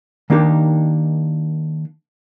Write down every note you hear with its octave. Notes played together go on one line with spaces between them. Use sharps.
D#3 A#3 D4 D#4 G4